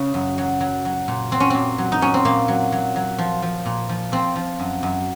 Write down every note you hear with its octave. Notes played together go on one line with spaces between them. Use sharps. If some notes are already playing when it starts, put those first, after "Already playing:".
Already playing: C#3 C#4
F#2
F#3
F#3
F#3
A#2
F#3 C4
C#4
A#2 C4
F#3
D#4
F#3 C#4
C4
A#2 A#3
F#3
F#3
F#3
F3
F3
A#2
F3
F3 C4
F3
F#2
F#2